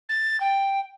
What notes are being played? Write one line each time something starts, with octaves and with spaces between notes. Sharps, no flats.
A6
G5